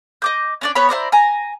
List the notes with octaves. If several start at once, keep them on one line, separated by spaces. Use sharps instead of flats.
D#5 D6 G6
C#4 D4 D5
B3 C#5 B5
E4 C5 D5 A#5
G#5 A#5